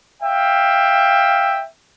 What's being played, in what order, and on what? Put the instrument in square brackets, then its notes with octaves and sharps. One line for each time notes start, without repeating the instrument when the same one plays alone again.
[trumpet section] E5 F5 G5